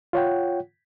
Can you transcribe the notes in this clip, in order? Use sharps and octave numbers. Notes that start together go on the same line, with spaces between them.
F4 C#5 F#5 G5